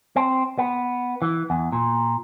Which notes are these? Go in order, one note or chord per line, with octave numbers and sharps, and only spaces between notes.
C4
B3
E3
E2
A#2